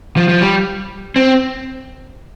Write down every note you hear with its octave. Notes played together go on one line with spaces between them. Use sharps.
F3
F3
G3
C4